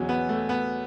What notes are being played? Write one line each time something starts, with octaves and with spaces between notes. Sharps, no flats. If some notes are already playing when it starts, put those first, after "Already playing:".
Already playing: E2 B2 F#3 C#4
B3
A3
B3